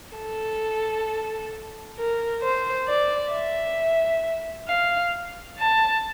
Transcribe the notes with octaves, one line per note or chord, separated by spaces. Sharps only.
A4
A#4
C5
D5
E5
F5
A5